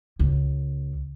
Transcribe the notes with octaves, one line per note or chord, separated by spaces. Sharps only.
C#2